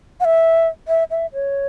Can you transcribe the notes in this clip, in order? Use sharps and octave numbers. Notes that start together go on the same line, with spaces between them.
F#5
E5
E5
E5
C#5